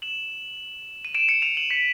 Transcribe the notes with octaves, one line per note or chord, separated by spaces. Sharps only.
E7 F#7
D#7
D7 E7
C#7 D#7
D#7 F7
E7 F#7
B6 C#7